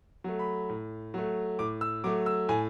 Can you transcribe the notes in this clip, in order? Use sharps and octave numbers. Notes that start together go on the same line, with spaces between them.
F#3 A3
B5
A2
F#3 A3
A2 D6
E6
F#3 A3 D6
E6
A2 G#5